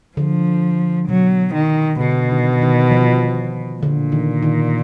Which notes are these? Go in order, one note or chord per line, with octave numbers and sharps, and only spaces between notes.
D3 F3
B2 F#3
D#3
B2 D3
D#3
D#3
F3
A#2 D3
D#3
D#3